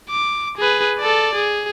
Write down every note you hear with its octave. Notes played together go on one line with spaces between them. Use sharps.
D6
G#4 B4
A4 D5
G#4